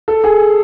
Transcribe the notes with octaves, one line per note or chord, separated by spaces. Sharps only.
A4
G#4